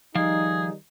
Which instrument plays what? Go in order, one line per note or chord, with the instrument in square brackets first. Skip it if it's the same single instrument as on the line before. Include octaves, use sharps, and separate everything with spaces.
[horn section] D#3 G3 D#4 [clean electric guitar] F3 F5 [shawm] G#4